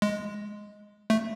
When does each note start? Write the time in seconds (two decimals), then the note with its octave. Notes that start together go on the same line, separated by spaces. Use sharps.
0.02 G#3
1.10 A3